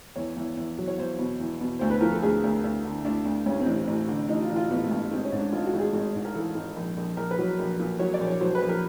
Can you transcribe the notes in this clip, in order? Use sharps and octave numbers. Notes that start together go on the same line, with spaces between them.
E2 C#5
E2
E2
F#3
C#5
E2 C5
B2
E2
B2
D2 C5
B4
F3 A#4
A4
D2 G#4
D2
D2
D3
D2 D4
D2
G2 C#4
C4
A1
A1
D3
A1 D#4
F4
A1
F4
A1 B3
A3
G2
G#1 C4
C#4
G#2
D4
G#1 F4
F#4
G#1
G#4
G#1
G#2
A#4
E3 A4
G#1
A#1
A#1
A#1 A#4
B4
F#3
A#1
A#2
F#3 C#5
D5
A#1
C#5
F#3 C5
B4
A#1
A#4